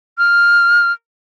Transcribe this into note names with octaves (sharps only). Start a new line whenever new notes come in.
F6